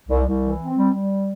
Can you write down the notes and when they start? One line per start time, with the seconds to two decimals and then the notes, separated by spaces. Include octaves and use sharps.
0.09 C2
0.27 C2
0.43 E3
0.61 C4
0.77 G3
0.94 G3